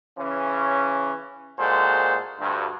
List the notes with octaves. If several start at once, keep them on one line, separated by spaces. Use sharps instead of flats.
C#3 E3 C#4
A#2 G#3 F#4 A4 C5
D2 G2